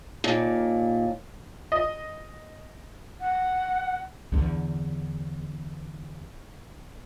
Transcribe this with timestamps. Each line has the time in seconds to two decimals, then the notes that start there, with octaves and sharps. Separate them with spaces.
0.24 D#2 A#2
1.72 D#5
3.21 F#5
4.32 E2 D3